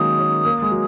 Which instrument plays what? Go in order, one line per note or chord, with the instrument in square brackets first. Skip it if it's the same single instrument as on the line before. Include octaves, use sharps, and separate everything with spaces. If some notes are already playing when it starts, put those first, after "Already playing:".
Already playing: [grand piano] D#3 F#3 G#3 A#3 C#4 [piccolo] D#6
[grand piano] C#4
A#3
G#3
F#3